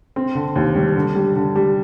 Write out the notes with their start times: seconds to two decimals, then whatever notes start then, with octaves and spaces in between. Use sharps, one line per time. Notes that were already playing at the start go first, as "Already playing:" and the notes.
0.16 C4
0.35 D3
0.56 D#2
0.75 G3
0.96 D3
1.15 G3
1.35 D3
1.55 G3